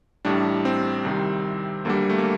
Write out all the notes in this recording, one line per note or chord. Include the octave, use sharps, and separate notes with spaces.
A1 A2 G3 D4
C4
C2 C3 D#3 G3
D2 D3 G3 A#3
A3
A#3